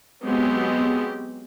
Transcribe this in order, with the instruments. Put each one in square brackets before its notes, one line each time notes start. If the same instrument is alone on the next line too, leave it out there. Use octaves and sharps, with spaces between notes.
[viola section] F#3 G#3 B3 C4 G4